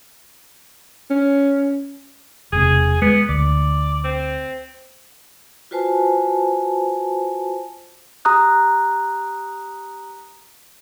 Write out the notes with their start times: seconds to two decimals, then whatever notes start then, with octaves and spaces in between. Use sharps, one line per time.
1.10 C#4
2.53 E1 C3 G#4
3.02 G#3 B3
3.29 D2 D5
4.04 C4
5.71 F4 F#4 B4 C5 G#5 A5
8.25 G4 A#5 D#6 F#6